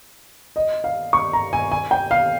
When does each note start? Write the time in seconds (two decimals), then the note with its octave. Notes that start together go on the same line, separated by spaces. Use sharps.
0.56 D#5
0.84 F5
1.13 C#6
1.33 A#5
1.53 G#5
1.72 G#5
1.91 G5
2.11 F5